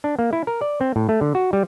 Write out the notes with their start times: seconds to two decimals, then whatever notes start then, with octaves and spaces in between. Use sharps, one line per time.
0.04 D4
0.19 A#3
0.33 E4
0.47 A#4
0.61 D5
0.81 C4
0.96 A2
1.09 A3
1.21 D3
1.35 F#4
1.53 G3